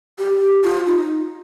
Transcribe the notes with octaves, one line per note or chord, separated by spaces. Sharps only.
G4
F4
D#4